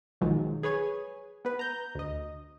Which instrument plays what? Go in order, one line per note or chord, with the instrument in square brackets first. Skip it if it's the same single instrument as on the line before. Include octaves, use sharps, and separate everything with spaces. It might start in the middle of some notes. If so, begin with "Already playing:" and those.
[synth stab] B1 D#3 F3 F#3 G#3
G#4 B4 C#5 G#5
B3 B4
A#5 G6
D2 D#5